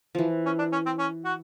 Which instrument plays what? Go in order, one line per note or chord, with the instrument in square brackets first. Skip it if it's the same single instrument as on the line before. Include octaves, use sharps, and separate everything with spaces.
[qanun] E3 F3
[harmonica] C#4
D4
C#4
C4
C#4
F#4